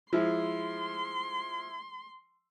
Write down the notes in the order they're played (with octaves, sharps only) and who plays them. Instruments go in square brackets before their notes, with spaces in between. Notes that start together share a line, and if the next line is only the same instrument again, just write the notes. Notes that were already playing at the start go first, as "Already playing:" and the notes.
[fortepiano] F3 G#3 [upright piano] E4 [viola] C6